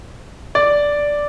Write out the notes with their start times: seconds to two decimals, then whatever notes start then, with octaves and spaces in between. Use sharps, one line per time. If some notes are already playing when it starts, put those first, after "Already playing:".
0.55 D5